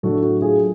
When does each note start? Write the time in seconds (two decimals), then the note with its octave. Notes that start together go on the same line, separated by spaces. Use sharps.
0.03 A2 F#3 A3 D4 F#4 A4
0.22 F#4
0.42 F4 G#4